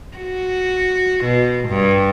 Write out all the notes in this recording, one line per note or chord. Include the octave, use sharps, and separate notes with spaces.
F#4
B2
G2